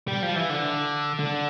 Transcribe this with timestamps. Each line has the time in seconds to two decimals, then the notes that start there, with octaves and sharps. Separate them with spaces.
0.08 G3
0.23 F3
0.36 E3
0.50 D3
1.19 D3